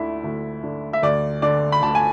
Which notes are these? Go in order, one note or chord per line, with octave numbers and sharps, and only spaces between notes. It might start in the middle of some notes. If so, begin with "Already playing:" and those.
Already playing: D2 D3 E4
D2
D3
E5
D2 D5
D3 D5
B5
D2 A5
G#5